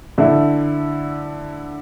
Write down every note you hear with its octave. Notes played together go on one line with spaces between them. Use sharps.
D3 A3 E4 A4